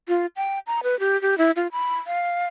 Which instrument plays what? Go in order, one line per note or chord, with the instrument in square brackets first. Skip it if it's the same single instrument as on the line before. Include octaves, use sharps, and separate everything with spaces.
[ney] F4
G5
A#5
B4
G4
G4
E4
F4
B5
F5